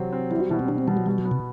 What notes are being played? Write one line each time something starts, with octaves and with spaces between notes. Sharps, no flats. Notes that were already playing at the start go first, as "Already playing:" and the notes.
Already playing: C3 F#3 C4
C4
G3 E4
F#4
B2 E4
C4
B2 D4
C4
B2 G3
F#3
B2 G3
F#3
B3
C3